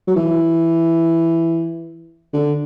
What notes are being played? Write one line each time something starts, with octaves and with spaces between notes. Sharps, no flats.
F#3
E3
D3